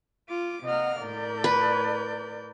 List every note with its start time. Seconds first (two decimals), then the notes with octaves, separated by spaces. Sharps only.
0.29 F4 D6
0.64 C3 A#3 D#5 F#5 F6
1.00 A2 A#4 D5 G6
1.44 B4